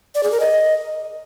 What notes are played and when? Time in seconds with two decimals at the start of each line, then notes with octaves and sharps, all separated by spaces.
0.15 D5
0.23 G#4
0.32 A#4
0.40 D#5